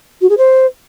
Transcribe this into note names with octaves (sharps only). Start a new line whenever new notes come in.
F#4
G#4
C5